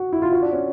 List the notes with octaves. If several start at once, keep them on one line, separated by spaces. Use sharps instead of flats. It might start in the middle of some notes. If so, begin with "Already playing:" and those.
Already playing: F#4
E4
F4
F#4
D4
C#4